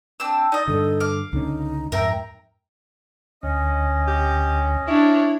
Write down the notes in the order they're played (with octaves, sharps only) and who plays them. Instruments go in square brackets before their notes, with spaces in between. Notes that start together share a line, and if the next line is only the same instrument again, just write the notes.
[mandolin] C4 D4 E6
[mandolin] D#4 D#5 [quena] D5
[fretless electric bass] G2 D3 [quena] A4
[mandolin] F5 D6
[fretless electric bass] C#2 D3 C#4 [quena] D#4
[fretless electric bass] F2 G#2 [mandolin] A#4 G5 A#5 [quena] E5
[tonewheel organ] D2 [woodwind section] C#4 D#5
[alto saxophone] G4
[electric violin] D4 C#5 [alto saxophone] E4